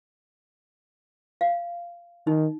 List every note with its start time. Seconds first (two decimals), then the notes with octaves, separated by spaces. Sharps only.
1.41 F5
2.27 D#3 D#4